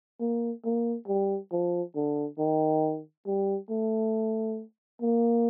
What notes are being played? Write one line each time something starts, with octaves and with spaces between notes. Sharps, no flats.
A#3
A#3
G3
F3
D3
D#3
G3
A3
A#3